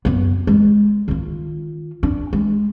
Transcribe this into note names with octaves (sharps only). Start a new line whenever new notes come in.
F#2 B3
G#3
D#3 F4
D4
G#3